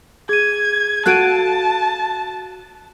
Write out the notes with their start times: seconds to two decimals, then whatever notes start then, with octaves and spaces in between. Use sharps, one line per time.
0.29 G#4 G#6 D#7
1.06 F#4 A4 F5 A5 F#6 D7 D#7